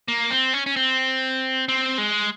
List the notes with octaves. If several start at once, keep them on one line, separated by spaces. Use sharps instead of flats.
A#3
C4
C#4
C#4
C4
C4
G#3